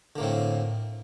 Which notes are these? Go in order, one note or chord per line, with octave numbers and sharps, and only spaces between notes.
A2 D3 A#3 C4